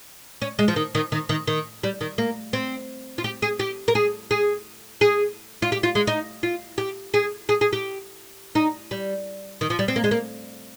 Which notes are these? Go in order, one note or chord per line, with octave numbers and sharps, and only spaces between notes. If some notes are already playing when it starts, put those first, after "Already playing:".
C#4
G#3
F3
D#3
D#3
D#3
D#3
D#3
G3
D#3
A#3
C4
F4
G4
G#4
G4
A#4
G#4
G#4
G#4
F4
G4
F4
G#3
D#4
F4
G4
G#4
G#4
G#4
G4
D#4
G3
D#3
F3
G3
C4
A#3
G#3
A#3